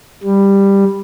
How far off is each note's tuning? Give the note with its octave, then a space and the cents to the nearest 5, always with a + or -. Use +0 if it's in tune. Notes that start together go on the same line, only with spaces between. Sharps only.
G3 +10